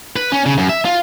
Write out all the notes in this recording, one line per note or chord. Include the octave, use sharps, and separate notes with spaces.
B4
C#4
C#3
F#2
E5
F4